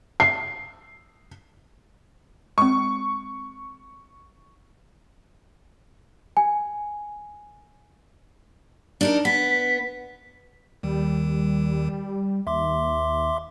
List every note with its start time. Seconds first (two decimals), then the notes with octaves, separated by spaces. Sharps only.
0.20 C7
2.58 G#3 C4 C#6
6.37 G#5
9.01 D4 D#4 A#4
9.25 B3 B6
10.83 D#2 D#3 G3
12.47 D#2 E5 C6 D6